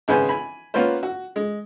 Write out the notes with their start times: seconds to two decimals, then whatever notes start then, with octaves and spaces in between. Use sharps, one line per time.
0.08 G#1 C#3 B3 B4 C5 G#5
0.29 G#5 B5
0.74 A#3 B3 C#4 F4 B4 C5
1.03 F#4
1.36 G#3